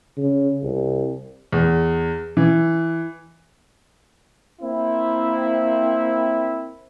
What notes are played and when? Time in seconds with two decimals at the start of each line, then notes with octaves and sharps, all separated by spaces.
0.18 C#3
0.63 C2
1.52 E2
2.37 E3
4.61 A#3 C4 E4